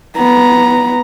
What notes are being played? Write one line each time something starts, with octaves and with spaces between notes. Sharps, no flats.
B3 A#5